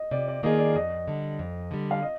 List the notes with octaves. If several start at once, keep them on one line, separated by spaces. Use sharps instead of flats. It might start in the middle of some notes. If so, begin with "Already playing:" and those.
Already playing: D#5
C3 D5
D5
D#3 A#3 F4 G#4 D#5
D5
F2 D#5
D3 G3
F2
D3 G3
F5
D#5